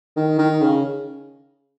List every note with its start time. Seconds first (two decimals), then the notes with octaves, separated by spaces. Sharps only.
0.16 D#3
0.38 D#3
0.61 C#3